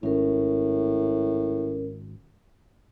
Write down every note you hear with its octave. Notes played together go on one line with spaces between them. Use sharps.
G#1 A2 C#4 A#4